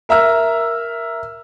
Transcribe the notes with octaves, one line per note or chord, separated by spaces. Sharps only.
A#4 E5 A#5 E6 F6